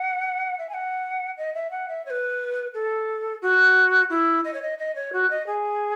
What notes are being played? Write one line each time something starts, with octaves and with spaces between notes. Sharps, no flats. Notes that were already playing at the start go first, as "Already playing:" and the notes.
Already playing: F#5
E5
G#5
F#5
D#5
E5
F#5
E5
C#5
B4
A4
F#4
E4
D#5
C#5
D#5
D#5
C#5
F#4
D#5
G#4